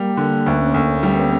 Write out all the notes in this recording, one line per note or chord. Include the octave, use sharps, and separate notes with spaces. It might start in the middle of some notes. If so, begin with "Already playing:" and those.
Already playing: G3 A#3
D3 A#3
D2 C#4
D2 C#4
G3 B3